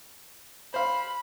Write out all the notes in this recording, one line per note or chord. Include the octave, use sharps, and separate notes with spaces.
C5 F5 B5